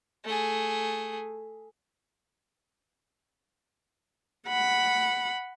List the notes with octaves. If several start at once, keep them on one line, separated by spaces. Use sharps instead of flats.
A3 G#4
F#5 B5